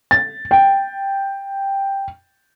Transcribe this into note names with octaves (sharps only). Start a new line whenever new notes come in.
A6
G5